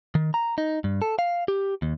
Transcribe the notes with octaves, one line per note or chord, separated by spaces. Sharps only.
D#3
A#5
D#4
G2
A4
F5
G4
D#2